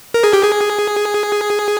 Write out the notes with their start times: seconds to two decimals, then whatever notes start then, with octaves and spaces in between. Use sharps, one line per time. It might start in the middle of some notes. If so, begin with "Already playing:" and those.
0.14 A#4
0.24 G#4
0.33 G4
0.43 G#4